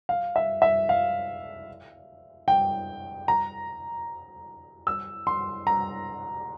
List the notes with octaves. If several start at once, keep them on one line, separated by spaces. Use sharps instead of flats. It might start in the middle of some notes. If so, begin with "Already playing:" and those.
F5
E5
E5
F5
G5
A#5
E6
C6
A#5